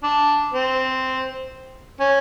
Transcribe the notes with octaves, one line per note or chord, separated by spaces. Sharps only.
D4
C4
C#4